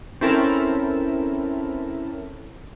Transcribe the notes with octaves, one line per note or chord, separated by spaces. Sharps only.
C4 C#4 E4 A4 A#4